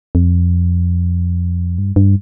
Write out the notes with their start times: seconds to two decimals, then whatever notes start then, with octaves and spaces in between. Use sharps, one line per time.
0.15 F2
1.78 G2
1.96 G2